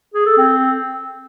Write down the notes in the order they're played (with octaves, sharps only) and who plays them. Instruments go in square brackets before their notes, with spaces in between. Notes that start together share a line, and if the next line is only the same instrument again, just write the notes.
[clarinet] G#4
A4
C4